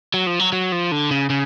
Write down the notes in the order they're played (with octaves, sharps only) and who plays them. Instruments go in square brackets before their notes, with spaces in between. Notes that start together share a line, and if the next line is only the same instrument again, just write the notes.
[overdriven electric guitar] F#3
F3
F#3
F#3
F3
D3
C#3
C#3